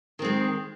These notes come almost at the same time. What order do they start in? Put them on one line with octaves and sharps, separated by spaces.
D#3 C4 G#3